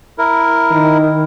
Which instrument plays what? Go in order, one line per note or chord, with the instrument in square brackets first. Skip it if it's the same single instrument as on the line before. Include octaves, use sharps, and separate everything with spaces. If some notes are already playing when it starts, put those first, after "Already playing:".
[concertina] E4 A#4
[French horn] D#3